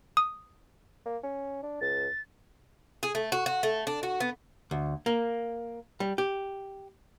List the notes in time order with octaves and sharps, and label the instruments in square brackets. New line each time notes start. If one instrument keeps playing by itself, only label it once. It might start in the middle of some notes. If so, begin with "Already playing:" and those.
[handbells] D#6
[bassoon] A#3
C#4
D4
[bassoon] C#2 [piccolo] A6
[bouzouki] G#4
A3
F#4
F#4
A3
D4
F#4
B3
[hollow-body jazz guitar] D2
A#3
G3
G4